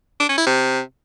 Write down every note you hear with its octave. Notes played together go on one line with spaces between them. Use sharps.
D4
C#4
E4
C3